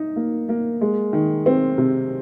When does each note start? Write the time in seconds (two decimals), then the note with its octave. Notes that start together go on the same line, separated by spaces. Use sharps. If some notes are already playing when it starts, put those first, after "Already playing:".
Already playing: D#4
0.16 A#3
0.49 A#3
0.81 G#3
1.13 D#3
1.46 C4
1.78 C3